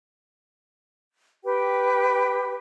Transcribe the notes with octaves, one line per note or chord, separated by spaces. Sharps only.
G4 B4 G5